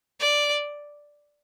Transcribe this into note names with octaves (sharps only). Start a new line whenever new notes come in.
D5